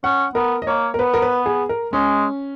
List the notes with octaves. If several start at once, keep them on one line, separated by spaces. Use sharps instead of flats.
C#4 F#5
B3 A#4
D#5
A#3 C#5
A#4
B3 B4
A#4
B4
G#4
A#4
G#3 C#4